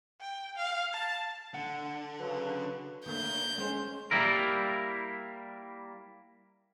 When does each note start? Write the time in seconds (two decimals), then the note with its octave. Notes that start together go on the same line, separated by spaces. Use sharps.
0.21 G5
0.56 F5
0.93 A5
1.54 D3 F#5
2.20 C#3 F#3 B4
3.06 D3 A3 A#3 G6
3.58 G#3 C#4 C5
4.11 G3 A#3 E4 A#4